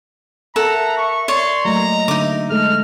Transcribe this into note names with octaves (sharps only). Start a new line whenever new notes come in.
A4 A#4 E5 F#5 A#5
C#6
C#5 D5 C6
F#3 A3 A#3 D#5 A#5
D3 D#4 E5 D6
G#3 A3 A4 D#5 F6